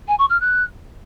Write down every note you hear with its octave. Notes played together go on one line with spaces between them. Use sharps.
G#5
C#6
F6
F#6